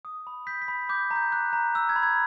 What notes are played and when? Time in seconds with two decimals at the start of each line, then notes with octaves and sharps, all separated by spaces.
0.05 D#6
0.27 B5
0.47 G6 B6
0.62 B6
0.68 B5
0.89 D6 G6
1.11 A#5
1.16 G6
1.32 F#6
1.53 A#5
1.75 E6
1.89 G#6
1.96 B5
2.03 G#6